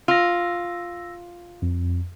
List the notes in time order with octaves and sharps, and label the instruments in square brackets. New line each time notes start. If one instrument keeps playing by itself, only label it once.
[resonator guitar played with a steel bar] F4 [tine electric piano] E6 A#6
[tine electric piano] F2